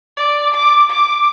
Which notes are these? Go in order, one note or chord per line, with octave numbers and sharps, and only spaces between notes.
D5
D6
D6